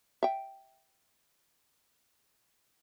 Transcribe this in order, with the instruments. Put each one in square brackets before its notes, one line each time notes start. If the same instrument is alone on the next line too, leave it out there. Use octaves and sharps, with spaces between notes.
[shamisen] E5 G5